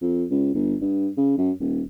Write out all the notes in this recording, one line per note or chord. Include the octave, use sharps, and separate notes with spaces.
F2
C#2
G1
G2
C#3
F#2
D#1